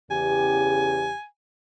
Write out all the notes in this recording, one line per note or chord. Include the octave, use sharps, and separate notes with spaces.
E2 C#3 G4 G#5